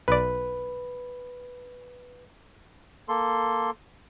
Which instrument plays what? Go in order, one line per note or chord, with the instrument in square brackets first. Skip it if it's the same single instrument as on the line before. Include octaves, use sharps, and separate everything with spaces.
[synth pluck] B1 D5 [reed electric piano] B4
[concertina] A#3 A4 C6